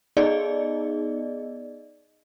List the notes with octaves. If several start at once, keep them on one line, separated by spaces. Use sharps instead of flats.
B3 D#4 G#4 D5 D#5